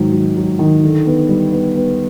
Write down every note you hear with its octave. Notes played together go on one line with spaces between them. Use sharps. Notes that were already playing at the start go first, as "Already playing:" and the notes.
Already playing: G#2 D#3 F#3
F#3
F#3
D#3
D3
B3
G3
B3
B3